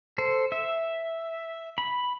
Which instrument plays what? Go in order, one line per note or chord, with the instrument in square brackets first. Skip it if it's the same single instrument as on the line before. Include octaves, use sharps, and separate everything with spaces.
[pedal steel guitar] A4 C5
E5
B5